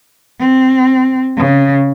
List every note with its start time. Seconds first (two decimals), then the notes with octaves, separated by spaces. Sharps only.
0.39 C4
1.37 C#3